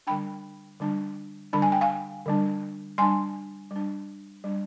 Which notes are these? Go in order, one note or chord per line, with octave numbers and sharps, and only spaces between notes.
D3 G3 D4 G5 B5
D3 G3 D4
D3 G3 D4 B5
G#5
G5
F5 G#5
D3 G3 D4
G3 D4 G#5 C6
G3 D4
G3 D4